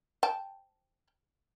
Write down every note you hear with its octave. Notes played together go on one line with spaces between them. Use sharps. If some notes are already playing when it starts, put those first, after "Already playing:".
G5 A5